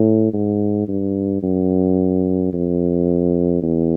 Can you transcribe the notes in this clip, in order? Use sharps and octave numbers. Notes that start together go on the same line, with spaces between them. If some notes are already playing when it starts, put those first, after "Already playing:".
Already playing: A2
G#2
G2
F#2
F2
E2